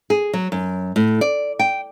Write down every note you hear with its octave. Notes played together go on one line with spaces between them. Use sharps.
G#4
F#3
F#2
A2
D5
G5